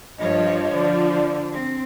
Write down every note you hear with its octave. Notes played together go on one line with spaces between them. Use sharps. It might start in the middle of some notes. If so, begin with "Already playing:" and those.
G2 F3 C#5 D#5
D3 D5
C4